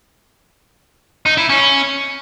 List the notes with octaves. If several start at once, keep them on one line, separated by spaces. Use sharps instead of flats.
D#4
E4
C#4